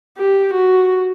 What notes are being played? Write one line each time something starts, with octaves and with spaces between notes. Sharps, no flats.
G4
F#4